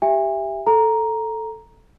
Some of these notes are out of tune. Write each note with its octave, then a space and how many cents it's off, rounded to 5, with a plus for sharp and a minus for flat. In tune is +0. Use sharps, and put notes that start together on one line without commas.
G4 +0 E5 +10 G#5 -40
A4 +0 A#5 +5